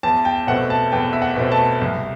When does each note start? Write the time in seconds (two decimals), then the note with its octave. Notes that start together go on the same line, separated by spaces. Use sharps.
0.03 E2 A5
0.25 G5
0.47 B2 A3 C4 F#5
0.70 A5
0.92 E2 G5
1.13 E5
1.22 F#5
1.36 B2 A3 C4
1.52 A5
1.81 C2